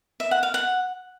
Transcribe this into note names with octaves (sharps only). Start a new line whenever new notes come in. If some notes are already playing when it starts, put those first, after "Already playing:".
E5
F#5
F5
F#5